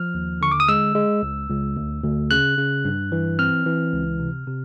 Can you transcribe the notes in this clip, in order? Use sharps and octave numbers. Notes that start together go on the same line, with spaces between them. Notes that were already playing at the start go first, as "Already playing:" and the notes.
Already playing: F3 F6
D#2
D3 C#6
D6
D#6
G#3 E6
G#3
C#2
C#2
D2
D2
C#3 F#6
C#3
G2
E3
C4 F6
E3
C#2
C3
C3